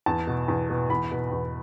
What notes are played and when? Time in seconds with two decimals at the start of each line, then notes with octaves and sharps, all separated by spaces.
0.06 E2 A5
0.27 B2
0.48 E2
0.70 B2
0.90 E2 B5
1.11 B2
1.32 E2